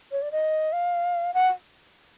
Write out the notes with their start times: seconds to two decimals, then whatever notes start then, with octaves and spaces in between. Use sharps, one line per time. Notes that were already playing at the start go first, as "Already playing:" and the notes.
0.12 C#5
0.22 D5
0.32 D#5
0.73 F5
1.34 F#5